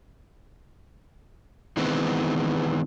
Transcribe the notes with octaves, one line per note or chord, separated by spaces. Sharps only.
D#3 E3 G#3 B3 C4